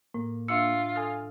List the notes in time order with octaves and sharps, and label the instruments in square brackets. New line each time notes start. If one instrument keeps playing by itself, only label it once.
[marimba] A2 [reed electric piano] A#3
[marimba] D4 E5 [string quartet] F4 [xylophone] E6 C#7
[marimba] A4 D#6 [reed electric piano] G#5 F6